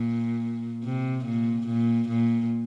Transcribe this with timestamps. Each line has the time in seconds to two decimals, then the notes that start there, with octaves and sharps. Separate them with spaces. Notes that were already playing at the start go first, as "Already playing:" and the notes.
Already playing: A#2
0.84 C3
1.25 A#2
1.67 A#2
2.09 A#2